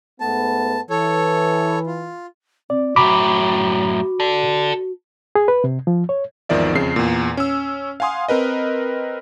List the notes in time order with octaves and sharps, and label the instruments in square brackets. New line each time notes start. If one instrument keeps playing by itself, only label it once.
[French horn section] G#2 A3 B3 [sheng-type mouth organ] A5
[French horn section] E3 [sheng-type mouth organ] A4 C#5
[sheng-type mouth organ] F4
[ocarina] C4 [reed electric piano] D5
[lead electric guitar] F#2 A2 [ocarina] F#4 [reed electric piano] B5 D6
[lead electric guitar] A4 D5
[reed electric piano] G#4
B4
C3
F3
C#5
[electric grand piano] G#1 E2 D#3 F3 D5 E5
F2 C#3 C7
E2 A#2
C#4 E6
F5 F#5 G#5 C6 D#6
C4 A#4 B4 D#5